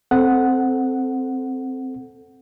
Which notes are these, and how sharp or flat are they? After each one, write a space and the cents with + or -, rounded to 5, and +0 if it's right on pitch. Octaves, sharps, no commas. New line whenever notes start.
C4 +0 A4 +0 F#5 +0